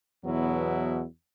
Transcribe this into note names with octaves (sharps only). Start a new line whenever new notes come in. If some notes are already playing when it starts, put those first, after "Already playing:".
E2 B2 F#3 B3 E4